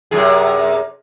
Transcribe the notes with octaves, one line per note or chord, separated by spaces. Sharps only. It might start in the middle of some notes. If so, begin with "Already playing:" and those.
F#2 C3 G#4